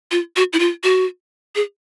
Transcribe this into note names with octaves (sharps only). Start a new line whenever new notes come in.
F4
F#4
E4
F4
F#4
G#4